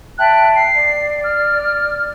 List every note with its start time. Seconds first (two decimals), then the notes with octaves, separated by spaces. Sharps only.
0.18 E5 G5 A5 F#6
0.56 C7
0.74 D5
1.24 F6